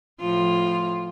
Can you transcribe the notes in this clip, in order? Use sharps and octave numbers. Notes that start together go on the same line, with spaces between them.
A2 F3 F4